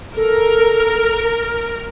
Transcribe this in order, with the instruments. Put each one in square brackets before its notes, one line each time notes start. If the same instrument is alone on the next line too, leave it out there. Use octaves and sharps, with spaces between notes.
[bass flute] A4 [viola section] A#4